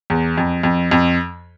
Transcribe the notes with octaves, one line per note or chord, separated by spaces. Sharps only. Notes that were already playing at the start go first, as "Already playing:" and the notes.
E2
F2
F2
F2